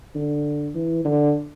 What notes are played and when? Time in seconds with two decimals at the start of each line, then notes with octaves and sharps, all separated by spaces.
0.16 D3
0.75 E3
1.05 D3